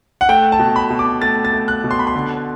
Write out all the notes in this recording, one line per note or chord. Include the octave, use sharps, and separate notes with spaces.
F#5
A3 G5
A5
B2
B5
B2
D6
A3 A6
A6
A3
F#6
B2
C6
B5
C6
D3